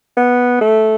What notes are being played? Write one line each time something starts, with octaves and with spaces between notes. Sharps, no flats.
B3
A3